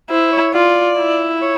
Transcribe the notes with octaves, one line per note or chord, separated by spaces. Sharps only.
E4 C5
C#5
F4 D5
E4
C#5